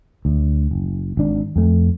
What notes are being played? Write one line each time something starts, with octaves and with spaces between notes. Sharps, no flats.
D2
F#1
G#1 D4
F2 A3